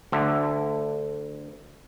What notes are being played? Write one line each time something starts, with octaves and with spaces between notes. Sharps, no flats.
D2 D3